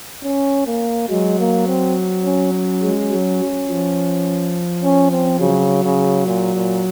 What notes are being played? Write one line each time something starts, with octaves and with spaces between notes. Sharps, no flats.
C#4
A#3
F#3 G#3
A#3
C4
C#4
C#4
G#3
F#3
F3
C#4
C4
C#3 F#3
C#3
A#2
A#2